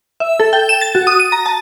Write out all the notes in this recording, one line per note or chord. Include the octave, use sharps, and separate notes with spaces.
E5
A4
G5
E7
A6
F#4
D#6
D#7
A#5
A5